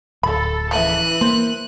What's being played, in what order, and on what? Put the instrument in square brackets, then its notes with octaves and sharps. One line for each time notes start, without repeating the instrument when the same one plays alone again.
[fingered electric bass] D1 [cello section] A4 [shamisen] B5
[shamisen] C#3 A4 E5 [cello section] E3 [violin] F#6 D#7
[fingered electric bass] A#3 [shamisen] C5